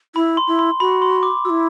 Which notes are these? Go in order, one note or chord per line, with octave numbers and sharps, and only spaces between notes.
E4 B5
C6
E4
C6
F#4 B5
C6
D6
E4 F#4 E6